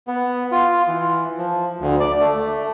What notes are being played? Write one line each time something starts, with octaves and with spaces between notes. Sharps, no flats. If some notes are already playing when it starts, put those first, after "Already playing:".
B3
F4
E3
F3
D2
D5
A3